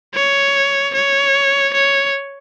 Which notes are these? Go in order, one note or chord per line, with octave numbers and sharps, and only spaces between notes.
C#5
C#5
C#5